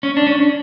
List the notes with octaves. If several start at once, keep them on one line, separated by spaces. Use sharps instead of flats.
C#4
D4
C#4